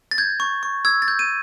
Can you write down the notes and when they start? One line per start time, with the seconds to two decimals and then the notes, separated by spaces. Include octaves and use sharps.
0.11 A6
0.18 G6 G#6
0.40 C#6
0.63 C#6
0.85 E6 G#6
1.02 A6
1.08 G6
1.19 D#7